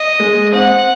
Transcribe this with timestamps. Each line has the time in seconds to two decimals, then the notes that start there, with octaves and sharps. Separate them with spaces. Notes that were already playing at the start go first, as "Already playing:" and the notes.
Already playing: D#5
0.20 G#3
0.52 C4 F#5